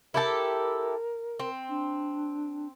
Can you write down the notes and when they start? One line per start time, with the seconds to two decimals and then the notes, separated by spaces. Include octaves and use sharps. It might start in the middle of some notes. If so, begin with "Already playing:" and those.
0.14 E4 G4 A4 A#4
1.39 C4
1.69 D4